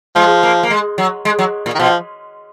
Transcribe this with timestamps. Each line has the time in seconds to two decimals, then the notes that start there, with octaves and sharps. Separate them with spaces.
0.15 F3 G#3
0.43 A#3
0.63 A#3
0.70 G#3
0.98 F#3
1.25 G#3
1.39 F#3
1.66 A#2
1.75 D#3
1.79 B2 F3